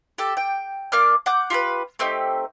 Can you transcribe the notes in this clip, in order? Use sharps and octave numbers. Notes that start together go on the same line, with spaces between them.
G4 A4
G5
A#3 D4 D6 F6
F#5 D6 G6
F4 G4 A4 B4
A3 C4 D#4 G4